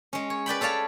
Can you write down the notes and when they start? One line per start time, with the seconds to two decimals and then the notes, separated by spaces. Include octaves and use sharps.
0.13 G#3 C#4
0.30 C#5
0.46 B4 D5 G5 B5
0.61 A4 C#5 D5 F5 A5